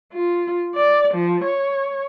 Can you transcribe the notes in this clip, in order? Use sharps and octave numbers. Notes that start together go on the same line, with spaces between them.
F4
D5
F3
C#5